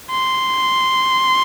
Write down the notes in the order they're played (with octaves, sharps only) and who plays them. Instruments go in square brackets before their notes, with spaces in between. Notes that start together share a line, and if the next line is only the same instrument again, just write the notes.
[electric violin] C6